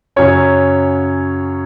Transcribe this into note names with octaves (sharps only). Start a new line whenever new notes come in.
F#2 C#3 F#3 C#4 C#5